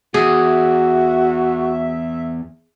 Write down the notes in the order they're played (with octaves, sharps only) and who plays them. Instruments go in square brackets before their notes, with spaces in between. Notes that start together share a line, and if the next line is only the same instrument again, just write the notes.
[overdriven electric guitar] E2 [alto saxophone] F#4 [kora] G#4 [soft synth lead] E5